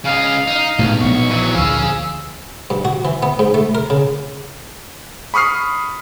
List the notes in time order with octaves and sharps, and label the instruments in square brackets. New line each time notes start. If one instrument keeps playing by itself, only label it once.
[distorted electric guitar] C#3 D#5 [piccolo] F5
[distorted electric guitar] D#4
[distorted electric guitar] B1 [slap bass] A2 C3 G#3
[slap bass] A#1 B3 [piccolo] C#6
[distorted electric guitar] E3 F#3
[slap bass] D2 A#2 F3 [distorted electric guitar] G#4 F5 [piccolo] E6
[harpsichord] G2
F#4
E3
B3
G#2
A3
A#4
C#3
[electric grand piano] B5 C#6 D#6 F6 C7